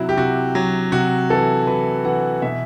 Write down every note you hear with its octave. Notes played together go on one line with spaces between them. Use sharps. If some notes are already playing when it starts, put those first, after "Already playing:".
Already playing: C3 F#3 E4 F#4
G4
C3 F#4
F#3
C3 F#4
E3 A4
E3 B4
E3 F#5
B2 E5